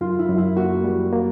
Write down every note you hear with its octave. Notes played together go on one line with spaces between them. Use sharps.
F#2 F4
E4
F#2
E4
A#3 F#4
G3
A#3